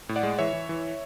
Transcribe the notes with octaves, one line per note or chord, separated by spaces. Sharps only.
A2
D5 F#5
G#3
E3 C#5 E5
E3
E3